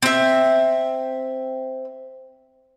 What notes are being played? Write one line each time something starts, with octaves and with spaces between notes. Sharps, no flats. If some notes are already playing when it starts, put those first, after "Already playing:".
C4 E5